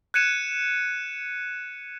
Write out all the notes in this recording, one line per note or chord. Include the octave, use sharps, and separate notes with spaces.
F#6 G#6 C#7 D#7 E7